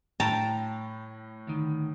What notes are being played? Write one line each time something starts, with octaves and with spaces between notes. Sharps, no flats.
A2 G5 A5 A#5
D2 D#3